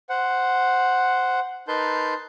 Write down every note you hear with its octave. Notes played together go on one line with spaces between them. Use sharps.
C5 F#5
D#4 A#4 B4 A5 C6 G6